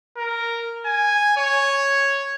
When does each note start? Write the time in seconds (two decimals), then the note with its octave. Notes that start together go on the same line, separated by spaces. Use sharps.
0.17 A#4
0.86 G#5
1.37 C#5